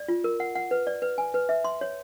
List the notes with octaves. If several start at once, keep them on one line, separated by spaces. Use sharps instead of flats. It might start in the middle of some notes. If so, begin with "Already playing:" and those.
Already playing: D5
F4
A#4
F#5
F#5
B4
D5
B4
G#5
B4
E5
C6
C#5